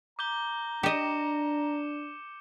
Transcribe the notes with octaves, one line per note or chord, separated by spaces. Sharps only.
A#5 D6 G6 G7
D4 G4 D#5 D6 C#7 E7